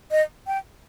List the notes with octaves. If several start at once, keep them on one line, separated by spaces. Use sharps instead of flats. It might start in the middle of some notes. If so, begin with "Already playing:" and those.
D#5
G5